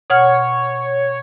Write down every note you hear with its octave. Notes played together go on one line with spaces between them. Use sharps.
B2 C#5 F#5 F6